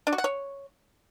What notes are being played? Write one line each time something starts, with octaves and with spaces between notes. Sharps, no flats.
D4
F#4
F#5
C#5